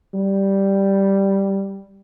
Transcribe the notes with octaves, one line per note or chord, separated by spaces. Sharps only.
G3